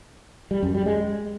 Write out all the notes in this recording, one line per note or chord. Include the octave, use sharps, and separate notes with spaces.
G3
F#2
G3
G#3